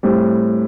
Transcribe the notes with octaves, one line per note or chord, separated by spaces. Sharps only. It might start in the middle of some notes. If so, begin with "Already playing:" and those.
A2 G3 C4